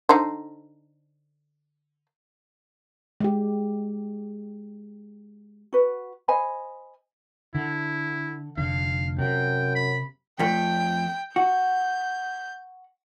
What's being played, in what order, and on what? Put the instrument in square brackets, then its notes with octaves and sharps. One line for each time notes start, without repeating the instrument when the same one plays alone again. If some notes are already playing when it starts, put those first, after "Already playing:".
[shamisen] D3 D#4 C5
[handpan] G#3 G4
[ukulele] F#4 B4
C5 D#5 G#5 B5
[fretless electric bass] D3 [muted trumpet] E4
[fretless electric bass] F1 D3 [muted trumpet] F5
[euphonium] F#2 [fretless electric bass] C3 [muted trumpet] G5
[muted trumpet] B5
[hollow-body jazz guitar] F2 A3 [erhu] G5
[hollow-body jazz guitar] F#4 [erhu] G6